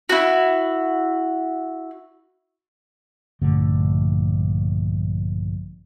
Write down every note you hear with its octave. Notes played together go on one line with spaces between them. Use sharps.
E4 F#4
A#1 G2 D3 A3